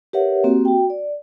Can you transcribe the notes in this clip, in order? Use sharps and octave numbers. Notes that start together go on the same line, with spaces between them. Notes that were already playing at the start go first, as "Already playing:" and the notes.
G4 A#4 B4 C#5 E5 F#5
A#3 C4 F#4 G4
F#4 G5
D5